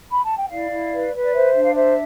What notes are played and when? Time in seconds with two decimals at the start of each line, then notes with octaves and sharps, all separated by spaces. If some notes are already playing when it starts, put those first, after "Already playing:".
0.10 B5
0.24 A5
0.37 G5
0.50 E4 D5 F5
0.70 E4
0.91 B4
1.13 B4
1.22 D5
1.33 C5 E5
1.53 D4
1.64 F5
1.74 C5 E5